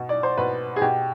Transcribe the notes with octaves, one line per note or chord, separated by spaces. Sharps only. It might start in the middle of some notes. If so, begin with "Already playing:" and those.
Already playing: B2
D5
C5
B2 B4
G#4
B2 G4